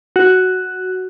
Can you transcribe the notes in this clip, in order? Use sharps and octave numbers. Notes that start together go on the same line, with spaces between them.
F#4